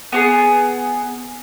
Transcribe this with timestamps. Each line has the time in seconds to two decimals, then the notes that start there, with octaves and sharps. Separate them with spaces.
0.12 B3 F#4 G#4